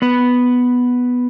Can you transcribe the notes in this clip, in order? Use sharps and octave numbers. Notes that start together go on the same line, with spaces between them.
B3 B4